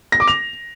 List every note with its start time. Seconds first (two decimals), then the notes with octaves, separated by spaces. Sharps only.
0.12 A#6
0.20 D6
0.28 F7